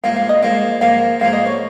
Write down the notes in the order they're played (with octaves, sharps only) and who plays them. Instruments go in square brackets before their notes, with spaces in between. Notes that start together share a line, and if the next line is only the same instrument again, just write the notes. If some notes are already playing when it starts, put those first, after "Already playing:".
[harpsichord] G#2 F3 A#3 [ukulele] F5
[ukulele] F5
D#5
[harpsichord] G#2 F3 A#3 [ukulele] F5
[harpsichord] G#2 F3 A#3 [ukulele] F5
[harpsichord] G#2 F3 A#3 [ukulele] F5
[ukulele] D#5
C#5